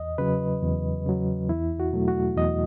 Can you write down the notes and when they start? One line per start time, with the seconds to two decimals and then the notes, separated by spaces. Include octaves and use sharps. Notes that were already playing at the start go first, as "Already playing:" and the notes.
Already playing: E2 D#5
0.18 C#3 F#3 B4
0.63 E2
1.06 C#3 F#3
1.49 E2 E4
1.80 F#4
1.93 B2 F#3 A3
2.08 F#4
2.37 E2 D#5